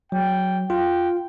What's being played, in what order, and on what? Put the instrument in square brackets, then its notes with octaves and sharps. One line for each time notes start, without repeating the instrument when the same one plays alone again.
[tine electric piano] F#3 [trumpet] G5
[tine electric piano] F4 [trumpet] G5